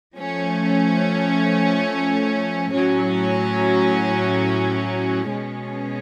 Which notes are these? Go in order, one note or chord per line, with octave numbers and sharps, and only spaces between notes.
F3 A3 C#4
A2 F#3 C#4
B2 G#3 C#4